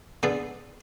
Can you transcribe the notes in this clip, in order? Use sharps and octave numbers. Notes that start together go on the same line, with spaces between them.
D3 B3 G#4 A4